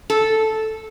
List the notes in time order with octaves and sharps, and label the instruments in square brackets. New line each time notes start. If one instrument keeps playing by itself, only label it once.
[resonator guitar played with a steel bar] A4